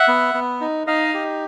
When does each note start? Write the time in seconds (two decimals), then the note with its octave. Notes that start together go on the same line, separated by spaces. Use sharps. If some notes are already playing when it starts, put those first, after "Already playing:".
Already playing: E5 F#5
0.08 B3
0.34 B3
0.61 D#4
0.87 D#4 D#5 F5
1.14 G4